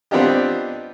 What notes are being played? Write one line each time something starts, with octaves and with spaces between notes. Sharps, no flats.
B3 C4 D4 F4 G4 D#5